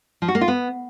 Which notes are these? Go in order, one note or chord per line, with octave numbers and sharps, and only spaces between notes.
F3
F#4
A#3
F4
B3